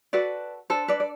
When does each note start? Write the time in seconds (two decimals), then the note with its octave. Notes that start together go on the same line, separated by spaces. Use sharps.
0.13 F#4 A4 B4 D5
0.70 D4 A4 C5
0.88 B4 D5
1.00 D5